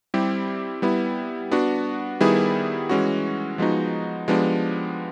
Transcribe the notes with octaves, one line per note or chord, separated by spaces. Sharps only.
G3 C4 E4 G4
G3 B3 E4
B3 D4 F#4
D#3 G3 B3 E4 G#4
E3 G#3 C#4 F#4
F3 G#3 B3 D#4 F#4
F3 G#3 B3 D4 G4